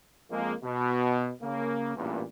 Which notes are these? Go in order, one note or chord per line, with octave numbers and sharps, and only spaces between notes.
F2 G#3 A#3
B2
C#3 A#3
A1 E2 G2 A#2